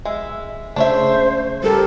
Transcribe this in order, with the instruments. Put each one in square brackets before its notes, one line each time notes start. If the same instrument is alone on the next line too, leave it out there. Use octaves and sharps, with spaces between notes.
[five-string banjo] G#3 [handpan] E5
[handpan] C#3 A3 [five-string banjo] D4 C#5 E5 [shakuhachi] C5
[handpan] G3 G4 A#4 [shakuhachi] A4